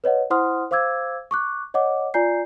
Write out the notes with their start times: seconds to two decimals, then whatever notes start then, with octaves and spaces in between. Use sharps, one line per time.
0.04 B4 C#5 D#5 F#5
0.30 E4 C5 F#5 C6 D#6 F6
0.71 C5 F5 D6 E6 G#6
1.31 C#6 D6 F#6
1.74 C#5 D#5 F#5 D6
2.14 F4 D5 G#5 A#5 G6 C7